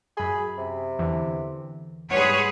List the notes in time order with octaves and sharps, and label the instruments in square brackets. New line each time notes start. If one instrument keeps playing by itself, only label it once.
[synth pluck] F#2 B5 [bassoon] G#4
[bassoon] C3
[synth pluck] E2 D3 E3
[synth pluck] G#2 G3 C6 [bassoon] B3 [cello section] G#4 B4 C#5